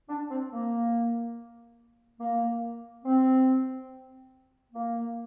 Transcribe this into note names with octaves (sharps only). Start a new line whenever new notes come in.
D4
C4
A#3
A#3
C4
A#3